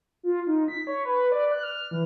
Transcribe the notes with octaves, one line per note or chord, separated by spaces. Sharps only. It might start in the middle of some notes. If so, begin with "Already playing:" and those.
F4
D#4
B6
C#5
B4
D5
F#6
F6
E3